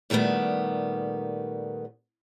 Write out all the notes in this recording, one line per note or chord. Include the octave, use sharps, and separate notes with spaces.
A#2 D#3 G3 A3 B3